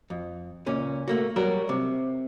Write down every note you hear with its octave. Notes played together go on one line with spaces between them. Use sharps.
F2
C#2 A#2 C#4
A3 A#3 F#4
F#3 G3 F#4 A#4
C3